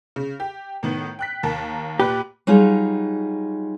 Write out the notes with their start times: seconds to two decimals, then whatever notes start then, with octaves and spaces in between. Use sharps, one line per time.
0.16 C#3
0.40 G4
0.83 A2 D#3 B3
1.19 G5 F#6 B6
1.43 D#2 A#4 A5
2.00 A#2 G4 B4 F#6
2.47 F#3 G3 D#4 F4 G#4